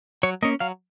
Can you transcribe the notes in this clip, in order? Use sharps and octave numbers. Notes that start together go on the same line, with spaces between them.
F#3 C#5
A#3 C#4 D#5
F#3 F5